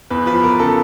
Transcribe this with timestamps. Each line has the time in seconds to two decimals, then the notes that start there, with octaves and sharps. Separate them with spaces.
0.10 E2 B4
0.26 F3 B4
0.43 E2 A#4
0.59 C#3 A4